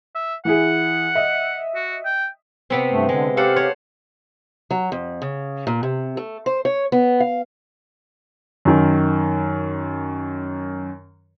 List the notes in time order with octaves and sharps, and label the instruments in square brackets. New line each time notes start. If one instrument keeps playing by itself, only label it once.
[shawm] E5
[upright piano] E3 E4 G#4 [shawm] F#5
[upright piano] D#5 E5
[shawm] F#4
G5
[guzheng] C3 B3 C4
[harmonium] G2 A3
[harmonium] D3 [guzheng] G#3
[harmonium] G4 F5 [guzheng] A4 C5 F#5
[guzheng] C5 C#5
[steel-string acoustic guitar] F#3
F2
C#3
A#2
C3
A3
C5
C#5
B3
F5
[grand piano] F#2 D#3